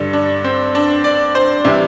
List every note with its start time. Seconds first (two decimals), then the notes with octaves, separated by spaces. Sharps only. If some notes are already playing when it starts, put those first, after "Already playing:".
Already playing: G2 D3 G3
0.13 D4
0.44 C4
0.75 D4
1.04 D5
1.35 C5
1.65 C3 E3 G3 E4